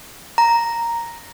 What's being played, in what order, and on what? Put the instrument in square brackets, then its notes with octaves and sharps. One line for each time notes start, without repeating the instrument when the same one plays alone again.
[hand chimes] A#5